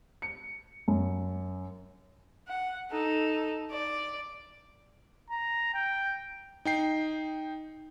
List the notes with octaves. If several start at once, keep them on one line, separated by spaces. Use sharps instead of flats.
C#7
F#2
F#5
D#4 A4
D5
A#5
G5
D#4 G5 C7